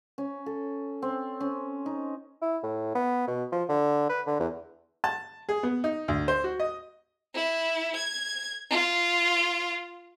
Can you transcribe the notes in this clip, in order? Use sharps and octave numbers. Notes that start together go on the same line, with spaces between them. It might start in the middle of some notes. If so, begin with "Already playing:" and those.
C#4
A4
C4
C#4
D#4
E4
A2
B3
B2
F3
D3
B4
D3
E2
A5
G#4
B3
D#4
D2
C5
F#4
D#5
E4
G#6
F4